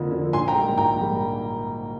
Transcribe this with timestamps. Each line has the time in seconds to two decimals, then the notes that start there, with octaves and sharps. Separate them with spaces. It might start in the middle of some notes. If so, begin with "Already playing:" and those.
Already playing: F2 D3 F3 A#3
0.12 D3 F3 A#3
0.33 A#1 G#5 C6
0.48 G5 A#5
0.55 G#2 G3 A#3
0.78 A#1 G5 A#5
1.00 G#2 G3 A#3